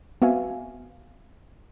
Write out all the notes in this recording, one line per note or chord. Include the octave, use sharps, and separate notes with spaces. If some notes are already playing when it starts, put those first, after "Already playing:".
B3 C4 F#4 E5 F5 G#5